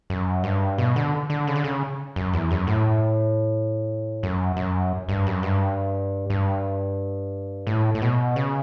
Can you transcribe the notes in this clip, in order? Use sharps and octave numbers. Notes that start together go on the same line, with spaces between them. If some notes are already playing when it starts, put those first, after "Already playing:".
F#2
G2
B2
D3
D3
C#3
D3
C#3
F#2
E2
F#2
A2
F#2
F#2
G2
F#2
G2
G2
A2
A2
B2
C#3